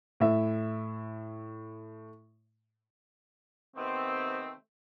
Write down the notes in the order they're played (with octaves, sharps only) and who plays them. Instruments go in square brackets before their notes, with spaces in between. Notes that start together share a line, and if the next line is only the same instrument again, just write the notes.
[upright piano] A2 E5
[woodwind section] C3 D#3 A3 B3 C4